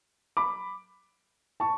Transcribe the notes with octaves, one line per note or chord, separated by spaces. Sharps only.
B5 D6
A5 C#6